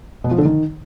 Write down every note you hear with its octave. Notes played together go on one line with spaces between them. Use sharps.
B2
F3
D3
D#3